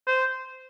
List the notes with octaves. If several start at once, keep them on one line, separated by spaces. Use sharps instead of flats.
C5